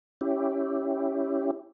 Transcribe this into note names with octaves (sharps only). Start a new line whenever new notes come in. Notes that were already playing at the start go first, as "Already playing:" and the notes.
C#4 E4 G4